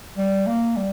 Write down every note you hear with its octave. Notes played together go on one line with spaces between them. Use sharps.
G3
A#3
G3